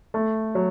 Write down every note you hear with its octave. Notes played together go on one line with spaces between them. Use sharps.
A3
F#3